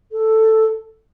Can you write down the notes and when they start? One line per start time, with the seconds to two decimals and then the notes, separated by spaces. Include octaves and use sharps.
0.11 A4